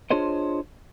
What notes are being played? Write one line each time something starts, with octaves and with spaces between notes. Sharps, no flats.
D4 F4 G#4 C5 C#5 D#5